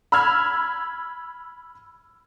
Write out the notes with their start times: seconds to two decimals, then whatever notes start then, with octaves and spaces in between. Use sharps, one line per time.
0.12 B5 E6 F6 G#6